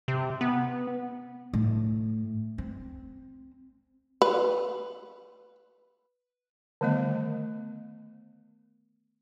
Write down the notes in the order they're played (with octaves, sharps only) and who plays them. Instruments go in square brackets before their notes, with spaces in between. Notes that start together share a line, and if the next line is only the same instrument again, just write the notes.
[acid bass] C3
B3
[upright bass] A2
C4
[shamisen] B4
[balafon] D3 D#3 G3 A3 B3 D#5